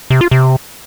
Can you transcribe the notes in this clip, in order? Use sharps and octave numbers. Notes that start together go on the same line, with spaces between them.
C3
F4
C3